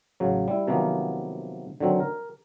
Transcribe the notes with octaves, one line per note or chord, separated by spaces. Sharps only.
A1 C#3 F#3
G3 E4
C3 D#3 F3 F#3 A#3 B3
D3 D#3 F#3 C4
A#4